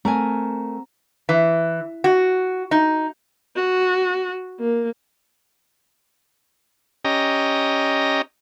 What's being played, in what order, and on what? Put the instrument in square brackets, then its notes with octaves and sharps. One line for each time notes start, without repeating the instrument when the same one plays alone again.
[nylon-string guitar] A3 A#4 G#5 [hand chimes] C4 A#5
[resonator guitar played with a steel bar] E3
F#4
D#4
[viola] F#4
A#3
[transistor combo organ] C#4 G4 D#5 A#5